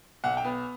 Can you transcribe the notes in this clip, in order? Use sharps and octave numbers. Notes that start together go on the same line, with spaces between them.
B1 F#5
G5
B3